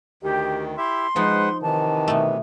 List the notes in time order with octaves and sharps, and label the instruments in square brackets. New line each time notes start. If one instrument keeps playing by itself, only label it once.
[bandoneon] D2 D#3 [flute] G4
[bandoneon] E4 G4 E5 [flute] C6
[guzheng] F3 D#4 [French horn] G#3 [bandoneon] B4 C5 F#5
[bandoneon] C3 E3 [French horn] D#3 [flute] A5
[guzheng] B2 A3